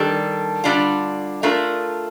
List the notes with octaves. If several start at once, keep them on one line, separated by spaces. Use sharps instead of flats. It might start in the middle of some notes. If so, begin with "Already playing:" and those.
Already playing: D#3 G3 D4 A4
D3 G3 D4 F4
A3 D4 F4 A#4